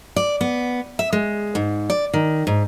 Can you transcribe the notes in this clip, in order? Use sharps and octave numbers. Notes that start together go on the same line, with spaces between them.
D5
B3
E5
G#3
G#2
D5
D#3
G#2